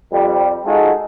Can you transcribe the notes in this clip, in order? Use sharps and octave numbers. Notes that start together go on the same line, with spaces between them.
F2 G3
G#3 D#4 F4 F#4 G#4 A4